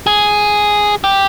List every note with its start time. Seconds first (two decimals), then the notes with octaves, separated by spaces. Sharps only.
0.07 G#4
1.04 G4